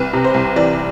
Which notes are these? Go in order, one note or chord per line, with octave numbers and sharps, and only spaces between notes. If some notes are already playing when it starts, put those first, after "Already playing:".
Already playing: C2 B4
C3
C5
C2
E3 D5